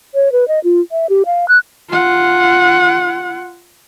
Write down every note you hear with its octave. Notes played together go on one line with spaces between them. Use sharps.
C#5
B4
D#5
F4
E5
G4
F5
F#6
F4 F#5